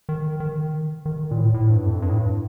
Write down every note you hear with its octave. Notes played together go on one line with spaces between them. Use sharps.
D#3
D#3
D#3
A#2
A2
A2
G2
F2
G2
A2
G2